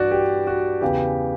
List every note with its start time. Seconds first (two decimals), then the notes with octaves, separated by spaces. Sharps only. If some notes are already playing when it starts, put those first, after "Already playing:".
Already playing: G2 E3 F#4 D5
0.11 G4
0.47 F#4
0.81 E2 C#3 E3 G4